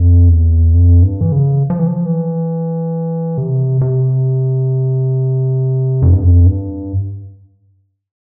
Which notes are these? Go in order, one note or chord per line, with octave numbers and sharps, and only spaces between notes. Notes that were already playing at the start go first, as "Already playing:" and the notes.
Already playing: F2
E2
F2
G2
E3
C#3
F3
E3
F3
E3
C3
C3
F2
G2
F2
G2